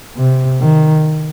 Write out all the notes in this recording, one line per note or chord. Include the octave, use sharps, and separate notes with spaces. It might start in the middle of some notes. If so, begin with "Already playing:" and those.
C3
D#3